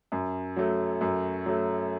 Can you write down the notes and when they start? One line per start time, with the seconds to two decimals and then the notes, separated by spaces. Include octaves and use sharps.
0.12 F#2
0.56 F#3 A3
1.01 F#2
1.46 F#3 A3